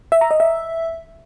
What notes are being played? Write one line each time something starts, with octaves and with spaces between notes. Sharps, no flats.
E5
A#5
D#5
E5